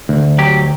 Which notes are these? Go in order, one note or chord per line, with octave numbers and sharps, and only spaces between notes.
D2
F#3 G4